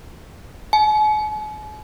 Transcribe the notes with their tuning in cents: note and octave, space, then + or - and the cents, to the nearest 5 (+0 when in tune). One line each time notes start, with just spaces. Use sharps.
G#5 +45